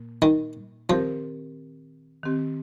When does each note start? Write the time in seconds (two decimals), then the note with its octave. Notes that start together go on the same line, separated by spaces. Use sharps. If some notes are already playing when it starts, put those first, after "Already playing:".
Already playing: A#2 A#3
0.22 D#3
0.89 D#3 F3 C4 G4 A#4
2.23 D#3 C4 G4